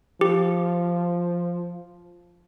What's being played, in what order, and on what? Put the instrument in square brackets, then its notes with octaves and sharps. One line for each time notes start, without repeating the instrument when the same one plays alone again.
[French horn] F3 [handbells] G4